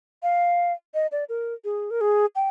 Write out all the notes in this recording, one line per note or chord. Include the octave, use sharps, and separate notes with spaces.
F5
D#5
D5
A#4
G#4
A#4
G#4
G5